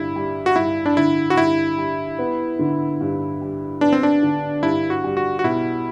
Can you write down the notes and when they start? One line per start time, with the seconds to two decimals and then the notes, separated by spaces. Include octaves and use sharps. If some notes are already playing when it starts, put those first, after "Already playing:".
Already playing: G2 D3 E4
0.16 G3
0.46 F#4
0.56 G2 E4
0.86 D4
0.97 D3 E4
1.30 F#4
1.37 G2 E4
1.78 G3
2.19 B3
2.59 D3
3.00 G2
3.41 G3
3.81 B3 D4
3.93 C4
4.03 D4
4.23 D3
4.62 G2 E4
4.90 F#4
5.04 G3
5.17 F#4
5.39 F#4
5.44 B2 E4